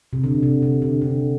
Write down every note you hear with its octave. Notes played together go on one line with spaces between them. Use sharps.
C3
D3
C3
C3
D3
D3